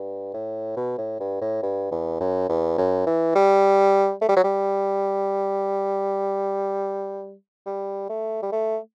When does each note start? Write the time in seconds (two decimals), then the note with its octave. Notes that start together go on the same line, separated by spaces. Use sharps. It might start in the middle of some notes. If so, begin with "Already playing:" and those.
Already playing: G2
0.34 A2
0.77 B2
0.98 A2
1.20 G2
1.41 A2
1.63 G2
1.91 E2
2.20 F#2
2.49 E2
2.78 F#2
3.06 E3
3.35 G3
4.21 A3
4.29 G3
4.36 F#3
4.44 G3
7.66 G3
8.09 A3
8.43 G3
8.52 A3